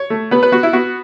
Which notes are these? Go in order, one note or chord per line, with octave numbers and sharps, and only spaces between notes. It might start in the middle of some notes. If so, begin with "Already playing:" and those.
Already playing: C#5
A3
B3 B4
B4
B3 F#4
E4
B3 F#4